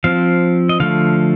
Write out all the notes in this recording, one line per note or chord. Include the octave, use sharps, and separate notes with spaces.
F3 C4 F5
D#5
D3 F3 A3 F5